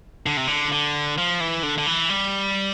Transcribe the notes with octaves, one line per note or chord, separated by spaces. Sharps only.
D3
C3
D3
D3
F3
E3
D3
D3
E3
G3